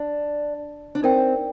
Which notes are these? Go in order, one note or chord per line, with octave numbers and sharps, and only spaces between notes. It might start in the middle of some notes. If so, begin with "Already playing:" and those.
Already playing: D4
D4
C4 D#4 A#4 D5 G5